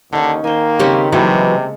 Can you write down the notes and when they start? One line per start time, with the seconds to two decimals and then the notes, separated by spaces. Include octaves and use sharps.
0.13 D#2 D3 C#4 D#4
0.44 D#3 A#3 C5 G#5
0.79 C#3 C4 C#4 G4 B5
1.12 C3 E3 F#3 G#3 A#3 E4 A4